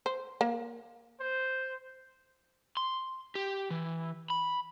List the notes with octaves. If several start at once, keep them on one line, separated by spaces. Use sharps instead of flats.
C5
A#3
C5
C6
G4
E3
B5